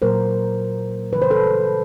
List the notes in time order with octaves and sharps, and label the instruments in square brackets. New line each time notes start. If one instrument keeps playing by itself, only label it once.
[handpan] A#2 F#3 A#3 A#4 C5
C#3 E3 G3 B4
C5
A4 B4